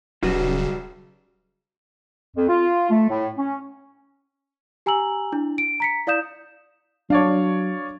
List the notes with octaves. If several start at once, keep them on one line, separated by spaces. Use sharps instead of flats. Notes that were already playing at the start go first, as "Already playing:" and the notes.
D#1 B1 C#3 G3 F#4 B4
F2
F4
A3
A2
C#4
G4 G#5 A#5 E6 F#7
D4 E4
D7
A#5 B6 C#7
E4 D5 F5 D#6 G6 E7
F#3 D4 C#5 D5 F5